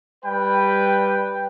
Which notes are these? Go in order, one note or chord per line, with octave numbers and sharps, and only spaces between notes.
G3 B4 G5